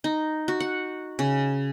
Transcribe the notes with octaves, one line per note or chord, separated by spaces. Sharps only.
D#4
F#4
F#5
C#3